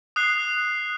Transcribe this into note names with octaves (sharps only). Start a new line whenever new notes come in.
D#6 F#6 C7